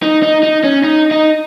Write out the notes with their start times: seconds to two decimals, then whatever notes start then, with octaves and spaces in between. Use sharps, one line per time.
0.03 D#4
0.23 D#4
0.43 D#4
0.64 C#4
0.84 D#4
1.11 D#4